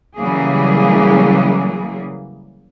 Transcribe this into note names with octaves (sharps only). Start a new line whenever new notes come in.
C#3 E3 F#3 G3 A#3 G#4